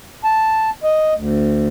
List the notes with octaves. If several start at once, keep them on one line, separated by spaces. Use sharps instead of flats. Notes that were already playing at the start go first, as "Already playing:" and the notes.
A5
D#5
D2